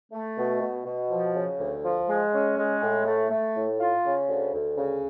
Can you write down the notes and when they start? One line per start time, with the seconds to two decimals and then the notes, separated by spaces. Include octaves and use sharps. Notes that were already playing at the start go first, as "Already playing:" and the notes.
0.12 A3
0.37 B2
0.61 B2
0.85 B2
1.11 F3
1.34 C#3
1.59 D2
1.84 F3
2.09 G#3
2.33 C#4
2.58 G#3
2.82 A2
3.06 A3
3.31 A3
3.56 A2
3.80 F4
4.05 C#3
4.28 D2
4.54 D2
4.77 C#3